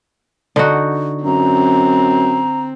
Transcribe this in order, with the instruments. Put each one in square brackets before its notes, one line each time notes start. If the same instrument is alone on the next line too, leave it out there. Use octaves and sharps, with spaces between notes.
[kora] D3 D#4 F#4
[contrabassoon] F#2 [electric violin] C4 [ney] A#5